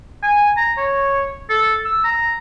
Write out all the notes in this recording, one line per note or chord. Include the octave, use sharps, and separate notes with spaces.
G#5
A#5
C#5
A4
E6
A#5